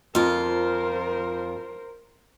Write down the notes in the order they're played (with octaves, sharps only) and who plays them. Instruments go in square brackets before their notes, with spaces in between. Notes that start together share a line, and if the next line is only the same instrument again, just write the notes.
[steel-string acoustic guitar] F2 F4 [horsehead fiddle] A#4 C5